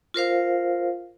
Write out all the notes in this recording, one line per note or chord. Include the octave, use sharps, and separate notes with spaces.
F4 A#4 C5 F5